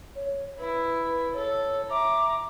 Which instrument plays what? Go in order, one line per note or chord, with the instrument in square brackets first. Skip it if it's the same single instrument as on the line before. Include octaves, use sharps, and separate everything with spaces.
[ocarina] C#5
[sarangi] E4 [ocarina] B4
[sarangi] A4 [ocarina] C#5
[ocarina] E5 [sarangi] A#5 [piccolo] D6